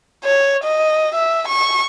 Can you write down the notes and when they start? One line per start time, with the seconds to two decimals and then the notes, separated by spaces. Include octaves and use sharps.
0.25 C#5
0.64 D#5
1.15 E5
1.48 C#6